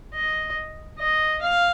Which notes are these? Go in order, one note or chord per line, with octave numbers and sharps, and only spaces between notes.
D#5
D#5
F5